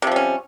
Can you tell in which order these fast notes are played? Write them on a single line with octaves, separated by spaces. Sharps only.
C3 F3 G3 C#4